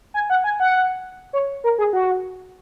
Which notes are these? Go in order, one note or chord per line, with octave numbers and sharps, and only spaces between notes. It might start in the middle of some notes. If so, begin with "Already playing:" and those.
G#5
F#5
G#5
F#5
C#5
A#4
G#4
F#4